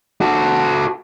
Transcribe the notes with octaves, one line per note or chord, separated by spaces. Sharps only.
F#4 A4